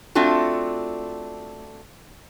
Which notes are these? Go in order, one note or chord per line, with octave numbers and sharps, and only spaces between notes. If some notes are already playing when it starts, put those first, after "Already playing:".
A3 C4 D4 F4 F#4